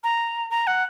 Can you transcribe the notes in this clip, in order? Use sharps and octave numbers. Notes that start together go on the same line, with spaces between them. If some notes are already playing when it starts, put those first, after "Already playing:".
A#5
A#5
F#5